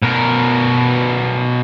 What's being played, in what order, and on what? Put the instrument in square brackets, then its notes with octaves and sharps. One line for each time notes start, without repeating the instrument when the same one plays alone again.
[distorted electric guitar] B2 A#4